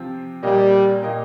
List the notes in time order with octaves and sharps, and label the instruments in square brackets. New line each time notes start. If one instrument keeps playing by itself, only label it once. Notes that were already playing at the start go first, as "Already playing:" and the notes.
Already playing: [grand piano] C3 F3 C4 G4
[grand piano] A#2 A#3 G4 D#5 [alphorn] G3
[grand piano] A#2 A#3 G4 D#5